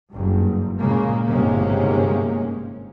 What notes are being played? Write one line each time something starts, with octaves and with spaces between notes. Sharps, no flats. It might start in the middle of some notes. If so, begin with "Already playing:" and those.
F#1 G2
A#2 C#3 G#3 A#3
G1 G#2 C3 G#3 A#3 C#4